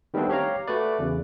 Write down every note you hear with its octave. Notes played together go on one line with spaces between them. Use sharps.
D#3 G3 A3 B3 C4 D4
G4 C#5 F5 A#5
A3 F#4 B4 D5
E2 C#3